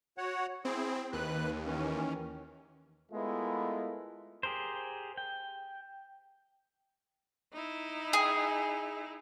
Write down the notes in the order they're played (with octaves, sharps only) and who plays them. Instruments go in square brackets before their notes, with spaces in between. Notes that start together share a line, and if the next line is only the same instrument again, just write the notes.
[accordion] F#4 C#5 F#5
[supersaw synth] C4 [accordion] E4 G#4
[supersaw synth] D#2 [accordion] B4 F#6
[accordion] D#3 E3 C#4
[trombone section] G#3 A3 B3 E4 F4 A#4
[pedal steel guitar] G4 G#4 A#4 C5
G5
[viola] D#4 E4
[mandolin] G#4